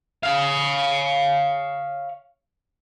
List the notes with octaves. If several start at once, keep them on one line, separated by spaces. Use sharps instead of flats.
C#5 F5